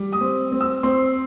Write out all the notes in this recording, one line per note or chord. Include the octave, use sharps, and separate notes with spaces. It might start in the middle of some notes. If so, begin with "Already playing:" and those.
Already playing: G3
D#6
C4
C4
E6
C4 C6